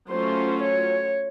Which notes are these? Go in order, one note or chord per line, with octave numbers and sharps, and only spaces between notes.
F#3 A3 C#4 F4 C5
C#5